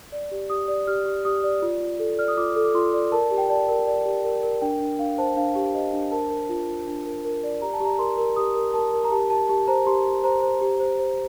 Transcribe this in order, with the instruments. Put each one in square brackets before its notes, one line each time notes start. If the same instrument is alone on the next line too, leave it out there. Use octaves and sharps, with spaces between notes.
[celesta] D5
G4
G4 D#6
D5
G4 F6
G4
G4 D#6
D5
F4
F4
A4
D5 F6
D#6
F4 D6
A4
D6
F4 C6
D5
A#4 A5
G4
G5
D5 A5
A#4
D5
G4
A#4
A#4
D4 G5
D4
D4 F5
C5 A5
D4 F5
G4
C5 D#5
D4
A#4 A5
A#4
F4
F4
D4
A#4
A#4
D5
G4 A#5
A5
G4 A#5
A#4 C6
A#4
G4 D#6
A#4
A#4 A5
A#4
A#5
G4 A5
G4 A5
G4 A5
C5 A#5
G4 C6
G4
C5 A#5
C5
G4
C5
C5